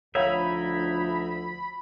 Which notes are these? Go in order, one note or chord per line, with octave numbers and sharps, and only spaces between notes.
D2 F3 D#4 E4 C#5 E5 F5 B5